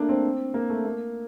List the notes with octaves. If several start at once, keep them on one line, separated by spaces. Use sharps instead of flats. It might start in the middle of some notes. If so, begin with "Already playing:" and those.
Already playing: A3 A#3 D4
C4
A#3
A3
A#3